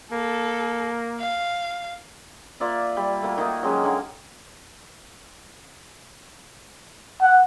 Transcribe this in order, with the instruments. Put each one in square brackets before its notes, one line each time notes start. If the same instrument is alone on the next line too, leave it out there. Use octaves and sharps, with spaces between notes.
[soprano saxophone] A#3 [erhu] A4
[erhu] F5
[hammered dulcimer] A#3 F4 D5 E5
G3
A3 A#3 F#4
D#3 A#3 D#4
F#3 G#3 C#4 G4
D3 A#3 A#4
[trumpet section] F#5